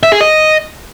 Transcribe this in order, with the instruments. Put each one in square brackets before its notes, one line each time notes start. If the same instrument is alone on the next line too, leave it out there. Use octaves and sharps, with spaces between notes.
[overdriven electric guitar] E5
G#4
D#5